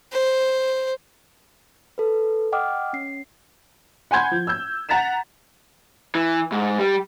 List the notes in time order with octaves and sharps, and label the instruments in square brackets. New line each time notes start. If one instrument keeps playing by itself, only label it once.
[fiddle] C5
[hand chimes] A4 B4
D#5 F#5 G5 D6 D#6 F6
C#4 C7
[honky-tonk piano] F#5 G#5 B5 C6 G6 G#6
F3
E6 G6
F#5 A#5 A6 B6 E7
[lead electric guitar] E3
G#2
G3